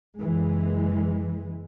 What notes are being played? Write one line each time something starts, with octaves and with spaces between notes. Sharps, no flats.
F#1 E3 G#3